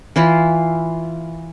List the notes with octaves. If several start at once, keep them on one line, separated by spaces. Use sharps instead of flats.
E3 E4 F4